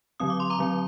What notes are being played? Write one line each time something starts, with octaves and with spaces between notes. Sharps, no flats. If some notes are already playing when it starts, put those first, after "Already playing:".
D3 F#3 C4 D#6
D6
C6
A#5 D6
D3 F#3 C4